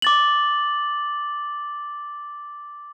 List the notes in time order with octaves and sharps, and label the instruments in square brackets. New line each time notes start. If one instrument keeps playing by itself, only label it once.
[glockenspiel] D6 A6 F#7